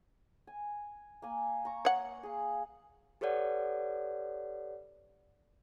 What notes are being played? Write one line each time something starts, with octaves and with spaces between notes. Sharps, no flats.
G#5
A#3 G#5
A#5 C#6
C#5 F#5
G#4 F5
G4 A4 B4 C#5 D5 F#5